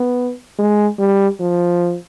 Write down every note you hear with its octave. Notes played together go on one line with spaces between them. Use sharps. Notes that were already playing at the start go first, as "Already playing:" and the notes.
Already playing: B3
G#3
G3
F3